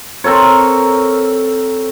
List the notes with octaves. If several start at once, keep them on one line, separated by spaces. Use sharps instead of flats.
C4 A4 A#4 C#5